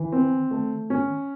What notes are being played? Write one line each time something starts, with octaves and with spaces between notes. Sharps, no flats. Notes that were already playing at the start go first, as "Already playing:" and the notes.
Already playing: D#3 E3
C4
A3
C#4